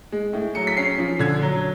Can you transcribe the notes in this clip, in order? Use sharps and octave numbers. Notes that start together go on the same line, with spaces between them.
G#3
A2
F#3 C#7
B6
C#4 C7
F3
D3 G#6
F#3